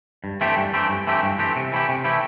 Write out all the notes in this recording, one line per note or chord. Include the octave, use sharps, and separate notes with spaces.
G2
E3 A3 C4 G4
G2
E3 A3 C4 G4
G2
E3 A3 C4 G4
G2
E3 A3 C4 G4
C3
E3 A3 E4 G4
C3
E3 A3 E4 G4